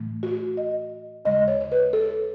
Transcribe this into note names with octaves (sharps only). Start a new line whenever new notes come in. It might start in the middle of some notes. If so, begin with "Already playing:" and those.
Already playing: A2 E3 A3
F#4
D#5
D#2 C#3 G#3 D#5
C#5
C#5
B4
A4